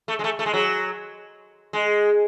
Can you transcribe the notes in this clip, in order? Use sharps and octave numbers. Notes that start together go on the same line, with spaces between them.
A3
G#3
A3
A3
G#3
F#3
G#3